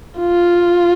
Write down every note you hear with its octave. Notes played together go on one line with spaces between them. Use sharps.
F4